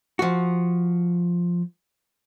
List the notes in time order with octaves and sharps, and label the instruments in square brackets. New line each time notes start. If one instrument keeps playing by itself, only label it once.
[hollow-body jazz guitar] F3 F#4